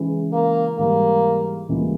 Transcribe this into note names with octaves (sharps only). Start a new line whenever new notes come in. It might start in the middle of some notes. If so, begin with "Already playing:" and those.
Already playing: C#3 E3 G#3
A#3
G#2 E3 G3 A#3
C#2 C#3 E3 G3 A#3